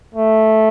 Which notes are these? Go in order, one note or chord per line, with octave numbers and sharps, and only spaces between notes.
A3